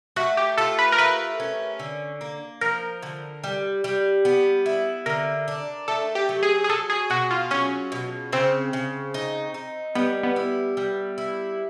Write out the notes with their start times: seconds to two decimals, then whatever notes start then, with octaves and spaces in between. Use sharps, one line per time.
0.16 A3 F#4
0.37 G4
0.58 F4 A4
0.79 B4
0.92 A#4
0.98 A3 B4
1.40 C#4
1.79 D3
2.21 A#3
2.61 F3 A#4
3.02 D3
3.44 G3
3.84 G3
4.25 B3
4.66 E4
5.06 D3 A#4
5.48 D4
5.88 A3 A4
6.15 G4
6.29 F#3
6.43 G#4
6.64 G#4
6.69 F#3 A4
6.90 G#4
7.10 B2 F#4
7.31 F4
7.51 F#3 C#4
7.92 B2
8.32 C#3 C4
8.73 C#3
9.14 D#4
9.54 D#4
9.95 G3 B3
10.23 B3
10.36 E4
10.77 G3
11.18 E4